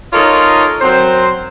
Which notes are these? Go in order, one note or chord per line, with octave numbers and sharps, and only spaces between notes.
D#4 F4 A4 A#4 C#5 D#5
F#3 C4 A#4 C5